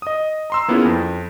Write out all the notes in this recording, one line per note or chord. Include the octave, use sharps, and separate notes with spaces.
D#5 D#6
A#5 C6 E6
A#3 B3 C#4 E4 F4 G#4
F2